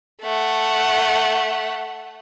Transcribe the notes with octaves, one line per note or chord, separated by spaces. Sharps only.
A3 F#5